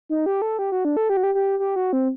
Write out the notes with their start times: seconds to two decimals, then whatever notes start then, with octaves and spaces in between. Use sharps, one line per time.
0.09 D#4
0.26 G4
0.42 A4
0.59 G4
0.72 F#4
0.85 D4
0.97 A4
1.09 G4
1.17 F#4
1.23 G4
1.35 G4
1.59 G4
1.76 F#4
1.93 C4